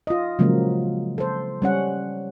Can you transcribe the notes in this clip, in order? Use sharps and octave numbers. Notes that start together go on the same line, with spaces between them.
F4 D#5
C#3 F3 F#3 G#3 A#3
A4 C5
G3 C#4 F#5